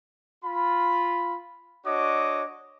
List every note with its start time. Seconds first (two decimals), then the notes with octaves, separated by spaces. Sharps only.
0.44 F4 B5
1.86 D4 F#4 C#5 D#5 D6